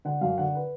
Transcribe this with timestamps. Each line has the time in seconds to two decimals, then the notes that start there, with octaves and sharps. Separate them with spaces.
0.05 D3 F#5
0.21 F#2 F5
0.38 D3 F#5
0.55 B4